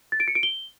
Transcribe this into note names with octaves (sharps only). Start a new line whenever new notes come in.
A6
D7
C#7
D7
G7